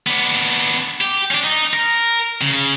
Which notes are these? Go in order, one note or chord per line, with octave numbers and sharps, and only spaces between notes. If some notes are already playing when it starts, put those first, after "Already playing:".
B3 D4
G4
C#4 D4
D#4
A#4
C#3